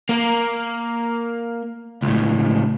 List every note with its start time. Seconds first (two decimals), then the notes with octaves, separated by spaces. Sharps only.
0.09 A#3 A#4
2.02 C#2 A2